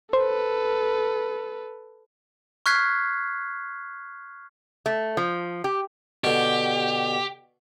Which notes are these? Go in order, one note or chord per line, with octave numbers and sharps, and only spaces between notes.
A4 B4 C5
C#6 F6 F#6 G#6 B6 C7
A3
F3
G4
B2 D3 G4